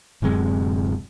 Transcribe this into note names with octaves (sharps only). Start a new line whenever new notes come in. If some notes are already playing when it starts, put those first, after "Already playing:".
D1 F#2 C3 G#3